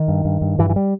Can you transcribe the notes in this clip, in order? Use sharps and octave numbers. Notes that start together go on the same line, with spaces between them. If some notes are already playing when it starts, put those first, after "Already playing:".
Already playing: D#3
G2
G2
G2
G2 E3
E3
G3